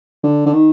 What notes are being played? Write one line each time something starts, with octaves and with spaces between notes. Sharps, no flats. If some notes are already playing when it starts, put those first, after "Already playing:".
D3
D3
D#3